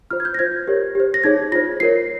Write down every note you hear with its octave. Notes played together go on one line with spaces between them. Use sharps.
F4 C5 F6
G#6
G6
A#6
F4 C5 G#6
G4 A#4 C#5
G4 C5
A#6
D#4 G#4 C#5 G#6
F4 C5 A#6
F4 A#4 C#5 C7